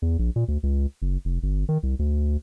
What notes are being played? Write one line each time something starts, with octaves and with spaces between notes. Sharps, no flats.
E2
A#1
A#2
D2
C#2
F#1
F1
G1
D#3
C2
D2